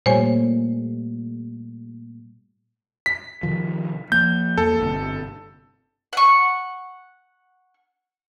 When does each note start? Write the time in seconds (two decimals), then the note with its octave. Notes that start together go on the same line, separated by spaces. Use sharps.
0.06 A#2 G3 A3 C5 C#5 G#5
3.06 B6
3.43 C3 D#3 F3
4.12 F3 A#3 G6
4.58 E2 A#3 A4
4.81 G1 C3
6.13 F#5 C#6